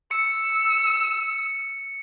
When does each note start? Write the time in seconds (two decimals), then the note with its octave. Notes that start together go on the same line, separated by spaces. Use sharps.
0.11 E6 C#7